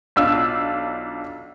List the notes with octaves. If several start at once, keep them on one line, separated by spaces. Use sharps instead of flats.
B1 D4 F4 E6